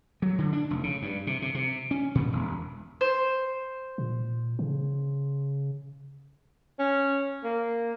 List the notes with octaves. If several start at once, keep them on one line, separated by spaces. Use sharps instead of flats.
F#3
D3
D4
F1
C#3
G2
C3
C3
C3
C#4
A#2
E1
C5
A#2
C#3
C#4
A#3